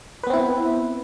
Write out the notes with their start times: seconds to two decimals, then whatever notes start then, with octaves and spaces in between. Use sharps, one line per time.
0.23 B4
0.27 B3
0.30 C4
0.33 E4